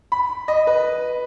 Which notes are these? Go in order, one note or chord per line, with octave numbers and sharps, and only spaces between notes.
B5
D#5
B4